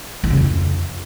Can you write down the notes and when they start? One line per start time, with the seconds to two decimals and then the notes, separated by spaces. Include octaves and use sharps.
0.24 E2
0.30 C#3
0.37 F2